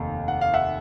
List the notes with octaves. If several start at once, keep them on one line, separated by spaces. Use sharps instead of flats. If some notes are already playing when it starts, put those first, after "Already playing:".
Already playing: F1 D#2 D#3
F#5
F5
E5 F#5